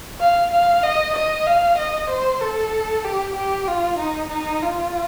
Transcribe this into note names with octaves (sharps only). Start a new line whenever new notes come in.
F5
F5
D#5
D#5
F5
D#5
C5
A4
G4
G4
F4
D#4
D#4
F4